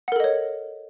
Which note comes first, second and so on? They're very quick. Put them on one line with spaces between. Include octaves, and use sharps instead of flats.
F#5 A#4 A4 D#5 C#5